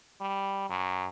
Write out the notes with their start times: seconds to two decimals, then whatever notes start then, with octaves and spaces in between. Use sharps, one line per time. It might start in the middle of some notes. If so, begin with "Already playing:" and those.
0.21 G3
0.69 F#2